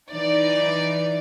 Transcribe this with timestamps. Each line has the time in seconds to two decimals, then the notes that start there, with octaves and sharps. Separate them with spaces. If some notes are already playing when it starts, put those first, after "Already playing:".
0.11 E3 D#4 D5